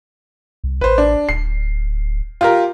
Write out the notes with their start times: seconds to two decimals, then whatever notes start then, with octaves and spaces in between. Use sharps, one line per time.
0.64 C2
0.81 A1 B4 C5
0.98 D4
1.29 D1 C7
2.41 F4 G4 A#4